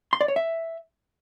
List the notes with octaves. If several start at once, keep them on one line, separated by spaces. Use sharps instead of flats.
C6
D5
C#5
E5